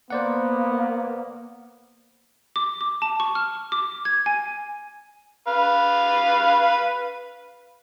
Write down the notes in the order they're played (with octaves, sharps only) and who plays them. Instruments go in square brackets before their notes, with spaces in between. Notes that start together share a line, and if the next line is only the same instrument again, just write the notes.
[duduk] A#3 [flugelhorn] B3 [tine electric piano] C5 D5 F#5
[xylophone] D6
D6
A5
C#6
F6
D6
G#6
G#5
[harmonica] B4 F5